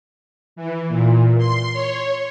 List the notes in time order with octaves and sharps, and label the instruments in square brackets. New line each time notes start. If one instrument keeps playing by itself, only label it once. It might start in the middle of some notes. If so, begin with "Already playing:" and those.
[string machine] E3
A#2
C6
C#5